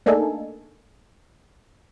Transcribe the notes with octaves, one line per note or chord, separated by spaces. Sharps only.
A3 A#3 D4 D#4 G#4 A4